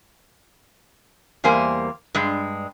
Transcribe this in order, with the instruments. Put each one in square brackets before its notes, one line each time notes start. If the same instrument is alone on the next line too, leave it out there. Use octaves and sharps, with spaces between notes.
[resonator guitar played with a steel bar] E2 G3 A#3 C5 G#5
G2 G#3